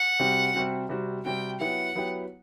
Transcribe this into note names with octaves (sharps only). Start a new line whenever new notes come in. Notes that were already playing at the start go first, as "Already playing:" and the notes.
Already playing: F#5
C3 G3 C4 F#4
C3 G3 C4 F#4
C3 G3 C4 F#4
C3 G3 C4 F#4 G5
F#3 B3 E4 G4 F#5
F#3 B3 E4 G4